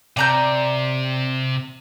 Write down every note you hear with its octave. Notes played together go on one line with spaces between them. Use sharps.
C3 D5 A#5 G6